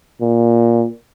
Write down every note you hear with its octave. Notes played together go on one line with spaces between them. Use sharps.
A#2